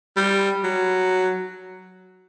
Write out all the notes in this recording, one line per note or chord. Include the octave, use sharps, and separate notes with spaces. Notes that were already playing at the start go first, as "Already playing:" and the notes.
G3
F#3